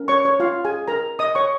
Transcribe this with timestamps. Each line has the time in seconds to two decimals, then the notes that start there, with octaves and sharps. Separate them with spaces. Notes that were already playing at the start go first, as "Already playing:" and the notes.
Already playing: C#4 A#4
0.08 C#5 C#6
0.25 C#5
0.40 F4 F5
0.65 G#4 G#5
0.88 A#4 A#5
1.19 D#5 D#6
1.35 C#5 C#6